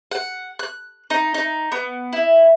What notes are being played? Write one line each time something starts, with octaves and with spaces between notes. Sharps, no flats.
F#5
F#6
D#4
D#4
B3
E4